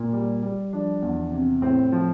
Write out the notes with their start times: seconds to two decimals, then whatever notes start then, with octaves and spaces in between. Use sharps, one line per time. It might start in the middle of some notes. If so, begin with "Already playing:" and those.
Already playing: A#2
0.13 G3
0.43 G3
0.73 F3 D4
1.02 E2
1.32 C3
1.62 A2 C4
1.92 F3